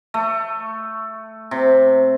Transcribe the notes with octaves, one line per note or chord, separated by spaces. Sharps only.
A3
C3